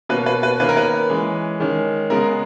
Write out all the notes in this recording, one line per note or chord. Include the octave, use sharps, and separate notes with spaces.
B2 A#3 C#4 B4
B4
B4
D#3 A#3 C#4 B4
A#4
B4
E3 G#3 C#4
D#3 G#3 C#4
C#3 G#3 B3 A#4